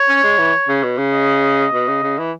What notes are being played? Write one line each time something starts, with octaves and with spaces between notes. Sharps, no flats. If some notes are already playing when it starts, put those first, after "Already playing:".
Already playing: C#5
C#4
G#3
E3
C#3
B2
C#3
D#5
B2
C#3
C#3
E3